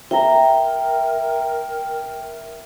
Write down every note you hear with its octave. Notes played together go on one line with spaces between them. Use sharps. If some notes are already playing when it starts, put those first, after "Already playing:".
A#4 E5 G5 A#5